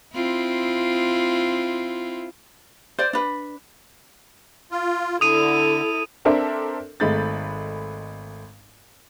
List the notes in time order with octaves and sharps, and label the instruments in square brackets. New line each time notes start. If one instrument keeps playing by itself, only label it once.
[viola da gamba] C4 E4 F4
[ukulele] C5 D5
D4 B4
[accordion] F4
[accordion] D3 [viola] E4 A4 [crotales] D#6 D#7
[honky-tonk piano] C4 D4 A4 A#4 C5 E5
G#1 G#3 A3 B5 G6 A6